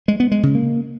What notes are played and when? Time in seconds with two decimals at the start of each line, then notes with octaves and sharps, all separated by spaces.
0.08 G#3
0.20 B3
0.32 G#3
0.43 C#3
0.55 A#3